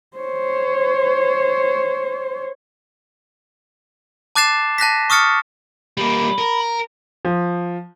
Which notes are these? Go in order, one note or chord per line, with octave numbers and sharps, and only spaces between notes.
C5 C#5
A5 D6 F#6 A6 C7 E7
A5 F#6 A#6 B6
C#6 D#6 F6 A6 C#7
G3 A#3 B5
A#4
F3